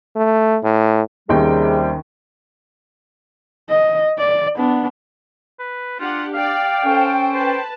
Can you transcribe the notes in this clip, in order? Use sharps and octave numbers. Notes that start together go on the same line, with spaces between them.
A3
A2
D#2 C3 D#3 G3 C#4 D#4 G#4 G5
D#5
D5
B3 D4
B4
D4 F4 G4 F#5
D5 F5 G5
C#4 A4 C5
B4 C5 A5